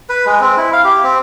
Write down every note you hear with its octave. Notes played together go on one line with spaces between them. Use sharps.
B4
G#3
C4
E4
F5
G4
C4